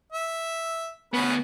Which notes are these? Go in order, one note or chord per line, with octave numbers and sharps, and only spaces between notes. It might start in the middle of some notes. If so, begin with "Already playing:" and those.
E5
D2 B3 C#4 B4